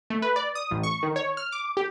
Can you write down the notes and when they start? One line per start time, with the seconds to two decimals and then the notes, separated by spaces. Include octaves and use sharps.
0.10 A3
0.22 B4
0.36 D5
0.55 D#6
0.71 A1
0.83 C#6
1.03 D#3
1.16 C#5
1.37 F6
1.52 D6
1.77 G4